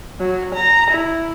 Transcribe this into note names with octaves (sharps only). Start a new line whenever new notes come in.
F#3
A#5
E4